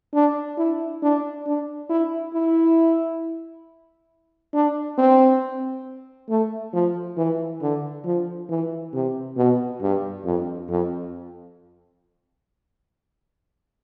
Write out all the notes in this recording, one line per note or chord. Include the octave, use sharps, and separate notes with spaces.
D4
E4
D4
D4
E4
E4
D4
C4
A3
F3
E3
D3
F3
E3
C3
B2
G2
F2
F2